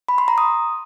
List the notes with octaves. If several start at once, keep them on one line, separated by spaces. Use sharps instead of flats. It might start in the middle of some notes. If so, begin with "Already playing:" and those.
B5
C6
A#5
D#6